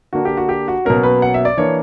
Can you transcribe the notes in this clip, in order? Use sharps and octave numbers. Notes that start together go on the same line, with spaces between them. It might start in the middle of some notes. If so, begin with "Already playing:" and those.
D3 A#3 D4 F#4
G4
F#4
G4
F#4
B2 F#3 A#3 C#4 A#4
B4
F#5
E5
D5
E3 A#3 D4 C#5